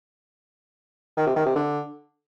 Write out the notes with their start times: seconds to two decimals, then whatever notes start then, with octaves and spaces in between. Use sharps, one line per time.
1.17 D#3
1.27 C3
1.36 D#3
1.46 C3
1.56 D3